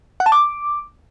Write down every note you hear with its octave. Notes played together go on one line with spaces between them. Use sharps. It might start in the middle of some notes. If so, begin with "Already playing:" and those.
F#5
A5
D6